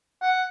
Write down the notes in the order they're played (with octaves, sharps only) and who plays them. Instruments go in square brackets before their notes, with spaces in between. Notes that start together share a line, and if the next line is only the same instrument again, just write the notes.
[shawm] F#5